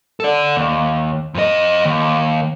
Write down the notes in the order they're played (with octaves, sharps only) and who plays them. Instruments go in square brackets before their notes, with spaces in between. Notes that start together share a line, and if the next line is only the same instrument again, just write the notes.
[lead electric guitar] A4 D5
D#2
F2 D#5
D#2